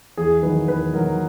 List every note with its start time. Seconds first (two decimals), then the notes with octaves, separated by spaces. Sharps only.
0.17 E2 G#4
0.43 D#3 F#3 B4
0.68 E2 B4
0.93 D#3 F#3 A#4